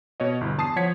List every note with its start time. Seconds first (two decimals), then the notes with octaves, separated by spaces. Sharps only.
0.20 B2 C#5 D#5
0.41 G1 E4
0.58 E2 A5 D#6 C7
0.76 F3 C#5 F#5 G#6 B6 C#7